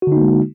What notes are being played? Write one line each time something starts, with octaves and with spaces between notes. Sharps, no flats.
D3 G#3 A#3 D#4 F#4